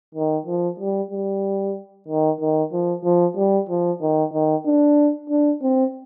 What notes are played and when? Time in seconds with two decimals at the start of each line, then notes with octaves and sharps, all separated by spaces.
0.15 D#3
0.46 F3
0.79 G3
1.11 G3
2.08 D#3
2.41 D#3
2.72 F3
3.04 F3
3.37 G3
3.69 F3
4.01 D#3
4.33 D#3
4.66 D4
5.30 D4
5.62 C4